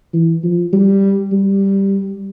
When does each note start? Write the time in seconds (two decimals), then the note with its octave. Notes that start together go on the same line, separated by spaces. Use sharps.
0.13 E3
0.43 F3
0.73 G3
1.32 G3